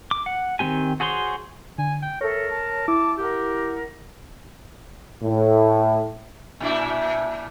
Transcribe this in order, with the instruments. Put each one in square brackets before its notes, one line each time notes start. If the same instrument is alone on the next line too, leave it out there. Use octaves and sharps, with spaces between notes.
[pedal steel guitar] D6
F#5
D#3 A#3 C4 G4 G#5
F#4 G#4 C5 C#5 C6
[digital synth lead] D3 [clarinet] G#5
[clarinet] G5
[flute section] A4 E5 [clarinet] A#4 [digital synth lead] C#5
[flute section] A5
[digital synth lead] E4 [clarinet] D6
[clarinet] G4 [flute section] A#4 F#5
[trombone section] A2
[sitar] A#2 D4 E4